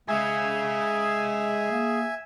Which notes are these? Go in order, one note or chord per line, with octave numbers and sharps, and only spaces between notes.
G#3 G#4 E5 F5 G#5
A#3